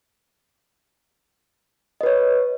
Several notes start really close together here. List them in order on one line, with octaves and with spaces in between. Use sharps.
D#5 B4 C#5